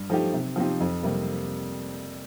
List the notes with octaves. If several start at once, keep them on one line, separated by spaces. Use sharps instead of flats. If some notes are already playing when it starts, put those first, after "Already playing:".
Already playing: G2
F3 A3 D#4 G4
C3
F3 C4 D#4 G4
F2
C3 G3 A#3